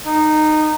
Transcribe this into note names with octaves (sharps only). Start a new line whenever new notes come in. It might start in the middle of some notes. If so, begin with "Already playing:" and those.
D#4